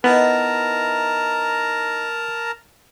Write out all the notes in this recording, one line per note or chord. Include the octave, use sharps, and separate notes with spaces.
B3 D#4 E4 A#4 A5 A#5